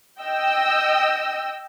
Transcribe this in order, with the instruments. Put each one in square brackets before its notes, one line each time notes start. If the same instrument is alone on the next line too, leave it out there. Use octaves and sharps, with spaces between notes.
[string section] D#5 G5 E6